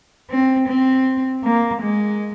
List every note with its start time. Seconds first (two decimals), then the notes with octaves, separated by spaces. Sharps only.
0.30 C4
0.68 C4
1.45 A#3
1.83 G#3